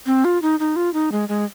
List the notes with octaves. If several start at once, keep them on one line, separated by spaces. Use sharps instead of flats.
C4
F4
D#4
D#4
F4
D#4
G#3
G#3